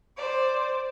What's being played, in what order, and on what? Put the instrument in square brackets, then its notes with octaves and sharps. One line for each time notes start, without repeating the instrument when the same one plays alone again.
[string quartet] C5 D5